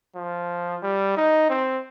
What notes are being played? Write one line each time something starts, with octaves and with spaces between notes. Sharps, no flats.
F3
G3
D#4
C4